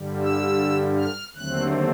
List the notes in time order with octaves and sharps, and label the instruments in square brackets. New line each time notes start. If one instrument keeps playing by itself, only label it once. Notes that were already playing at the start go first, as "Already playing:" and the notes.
Already playing: [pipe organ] G2 D3 G3
E6
F6
D#2 D3 F#3 A3 C4 F#6